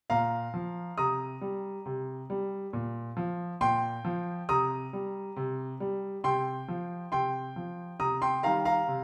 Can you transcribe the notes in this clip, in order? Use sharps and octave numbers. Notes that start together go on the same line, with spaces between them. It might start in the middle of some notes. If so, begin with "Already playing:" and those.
A#2 F5 A#5
F3
C3 A#5 D#6
G3
C3
G3
A#2
F3
A#2 G5 C6
F3
C3 A#5 D#6
G3
C3
G3
C3 G5 C6
F3
C3 G5 C6
F3
C3 A#5 D#6
G5 C6
D#3 G3 F5 A#5
F5 A#5
C3